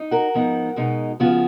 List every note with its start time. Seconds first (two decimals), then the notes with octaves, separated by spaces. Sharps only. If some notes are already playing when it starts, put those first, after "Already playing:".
Already playing: D#4
0.11 F#4 A#4
0.34 G#2 F3 B3 D#4
0.76 B2 G#3 D#4
1.20 C#3 F3 B3 F4 F#4